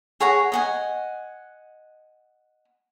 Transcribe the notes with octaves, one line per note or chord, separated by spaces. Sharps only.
G#4 C#5 F#5 A#5
D#5 F#5 G#5